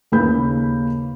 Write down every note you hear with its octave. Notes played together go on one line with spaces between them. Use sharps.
D#2 C#3 A#3 B4 B5 G6